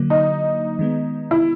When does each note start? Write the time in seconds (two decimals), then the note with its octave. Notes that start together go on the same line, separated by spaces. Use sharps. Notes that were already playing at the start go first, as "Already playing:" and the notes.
Already playing: D3 F#3 A#3
0.10 D#4
0.79 D#3 G#3 B3
1.31 E4